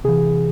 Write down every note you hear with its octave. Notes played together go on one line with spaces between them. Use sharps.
C3 E3 G#4